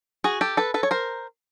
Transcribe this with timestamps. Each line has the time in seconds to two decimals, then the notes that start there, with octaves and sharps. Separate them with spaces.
0.24 F#4 G#4
0.41 G4 A4
0.57 A4 B4
0.74 A4 B4
0.83 C#5
0.91 A#4 C5